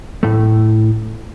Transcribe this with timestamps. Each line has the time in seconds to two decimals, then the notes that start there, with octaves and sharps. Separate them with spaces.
0.23 A2 A3